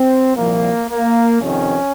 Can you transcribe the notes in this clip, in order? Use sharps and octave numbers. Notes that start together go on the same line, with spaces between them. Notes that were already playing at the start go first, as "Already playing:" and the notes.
Already playing: C4
C2 A#2 F3 A#3
A#3
F2 C3 D#3 C#4